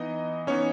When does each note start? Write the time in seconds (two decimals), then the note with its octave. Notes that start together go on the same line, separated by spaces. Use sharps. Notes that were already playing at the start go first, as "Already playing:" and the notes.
Already playing: E3 B3 D#4 D#5
0.47 E3 B3 C#4 D#4 C#5